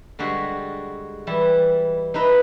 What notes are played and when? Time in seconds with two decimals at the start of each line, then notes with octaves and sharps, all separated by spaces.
0.19 D3 G3 G#3 F#4 G4
1.27 E3 G3 E4
2.14 D#4 E4 B4 D#5